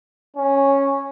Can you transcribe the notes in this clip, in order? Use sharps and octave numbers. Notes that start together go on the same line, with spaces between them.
C#4